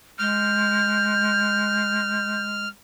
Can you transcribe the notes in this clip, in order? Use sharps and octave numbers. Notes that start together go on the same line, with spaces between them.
G#3 F6 G6